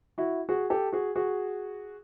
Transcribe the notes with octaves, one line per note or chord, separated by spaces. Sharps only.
E4 F#4
F#4 G#4
G4 A4
F#4 G#4
F#4 G#4